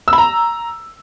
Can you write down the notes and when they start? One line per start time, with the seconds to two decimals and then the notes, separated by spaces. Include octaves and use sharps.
0.08 E6
0.13 B5
0.18 A#5